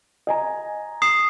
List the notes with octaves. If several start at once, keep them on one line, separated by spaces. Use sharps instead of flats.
D#5 G#5 A#5
D#6 C7 E7